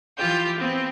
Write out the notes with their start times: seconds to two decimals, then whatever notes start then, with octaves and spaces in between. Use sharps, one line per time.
0.17 E3 F4 G4 G6
0.58 B3 C4